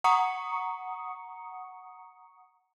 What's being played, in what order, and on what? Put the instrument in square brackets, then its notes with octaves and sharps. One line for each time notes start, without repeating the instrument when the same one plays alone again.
[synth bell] F#5 A#5 C#6 D#6 C#7